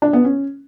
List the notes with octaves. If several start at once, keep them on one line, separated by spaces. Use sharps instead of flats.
D4
B3
C#4